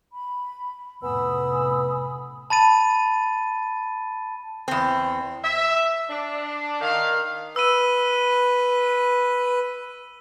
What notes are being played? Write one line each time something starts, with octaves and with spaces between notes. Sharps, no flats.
B5
F1 A2 B3 G#5 B5 D#6 E6
A5 B5 A6 D#7
E2 C4
E5
D4
D#3 F5
B4 E6 D#7